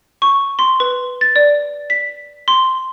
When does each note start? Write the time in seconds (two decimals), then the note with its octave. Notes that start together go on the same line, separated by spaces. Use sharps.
0.22 C#6
0.59 C6
0.80 B4
1.21 A6
1.36 D5
1.90 B6
2.48 C6